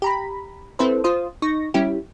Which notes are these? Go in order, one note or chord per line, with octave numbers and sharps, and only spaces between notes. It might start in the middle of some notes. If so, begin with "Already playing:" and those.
G4 A#5 B5
C4 E4 A4 B4 C5
F4 C5 D#6
D#4 C#6 A#6
G3 C#4 E4 G4